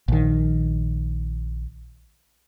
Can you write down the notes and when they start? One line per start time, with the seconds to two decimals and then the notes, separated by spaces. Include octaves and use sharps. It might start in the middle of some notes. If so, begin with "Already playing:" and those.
0.08 A#1 D#3